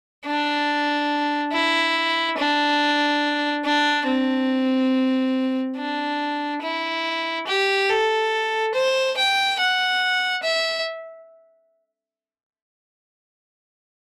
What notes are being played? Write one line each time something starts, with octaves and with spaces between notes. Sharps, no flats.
D4
E4
D4
D4
C4
D4
E4
G4
A4
C5
G5
F#5
E5